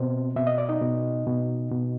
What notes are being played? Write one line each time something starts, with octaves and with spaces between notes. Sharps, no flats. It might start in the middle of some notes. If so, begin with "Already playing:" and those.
Already playing: B2 C4 C5
B2 E5
D#5
D5
D#4 D#5
B2
B2
B2